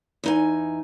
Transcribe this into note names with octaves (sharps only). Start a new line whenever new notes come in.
E2 D#4 G#5